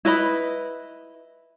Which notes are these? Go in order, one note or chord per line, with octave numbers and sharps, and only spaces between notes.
E4 B4 D#5 B5